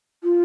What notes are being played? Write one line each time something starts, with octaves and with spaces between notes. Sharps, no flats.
F4